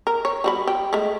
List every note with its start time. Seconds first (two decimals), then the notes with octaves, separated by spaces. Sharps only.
0.07 A#4
0.25 C#5
0.44 G3 F#4 B5
0.67 G4
0.93 G#3 A3